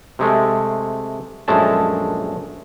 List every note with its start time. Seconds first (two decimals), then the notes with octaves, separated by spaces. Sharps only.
0.19 C3 G#3 A3
1.48 A#1 F#2 G#3 A3 A5